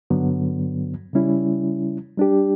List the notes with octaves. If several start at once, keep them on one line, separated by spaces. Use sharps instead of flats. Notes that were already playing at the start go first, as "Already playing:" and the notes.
G2 D3 F#3 B3
C#3 G3 C#4 E4
G3 D4 G4